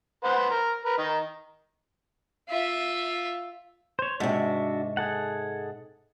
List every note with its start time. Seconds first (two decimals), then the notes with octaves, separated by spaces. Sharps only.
0.24 B4 C5 F#5
0.50 A#4
0.85 A#4 B4
0.98 D#3 D#4
2.49 F4 E5
3.99 C5 C#5
4.20 G#2 C3 D4 F#4 E5
4.97 G#4 A4 F#5